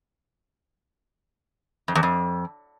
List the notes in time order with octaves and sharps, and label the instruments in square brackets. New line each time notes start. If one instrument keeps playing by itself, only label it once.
[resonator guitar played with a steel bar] F2
E2
F2